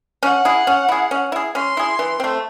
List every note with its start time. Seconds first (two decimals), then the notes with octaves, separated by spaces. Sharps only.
0.23 C#4 F#5
0.45 E4 G#4
0.67 C#4
0.88 E4 G#4
1.11 C#4
1.32 E4 G#4
1.54 C#4 C6
1.77 E4 G#4
1.99 E3
2.20 A3 C4